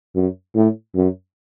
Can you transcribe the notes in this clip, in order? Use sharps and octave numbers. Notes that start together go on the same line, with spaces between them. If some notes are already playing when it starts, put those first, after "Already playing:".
F#2
A2
F#2